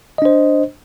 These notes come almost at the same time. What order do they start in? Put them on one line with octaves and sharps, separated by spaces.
D#5 D4 C5